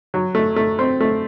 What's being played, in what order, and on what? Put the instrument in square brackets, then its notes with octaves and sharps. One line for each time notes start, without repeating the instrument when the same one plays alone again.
[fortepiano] F#3
A3
A3
C4
A3